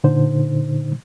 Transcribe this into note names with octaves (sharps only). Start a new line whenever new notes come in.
A#2 D3 D#4 C5